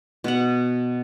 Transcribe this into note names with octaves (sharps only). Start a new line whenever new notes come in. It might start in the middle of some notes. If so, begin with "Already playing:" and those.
B2 F#5